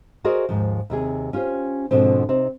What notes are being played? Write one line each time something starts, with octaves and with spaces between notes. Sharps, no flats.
F#4 G#4 A#4 C5 D5 D#5
D#2 G#2 F3
D#2 C3 G#4
C#4 F4 G4 C5
G#2 B2 D3 F3 C4
C3 C4 D#4